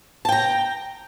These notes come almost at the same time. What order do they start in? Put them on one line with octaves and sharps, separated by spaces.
A5 G5 A#5